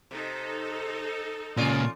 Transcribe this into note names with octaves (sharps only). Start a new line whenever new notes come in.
C3 D#4 A4
A#2 C#3 C#4 F4 D5